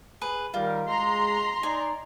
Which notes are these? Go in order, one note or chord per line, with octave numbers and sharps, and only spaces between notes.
G#4 B4
D#3 G3 F4 A#4
G#3 A#5 C6
D#4 D5 G#5